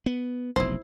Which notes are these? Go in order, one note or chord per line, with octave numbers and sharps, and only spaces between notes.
B3
F1 B1 E4 C5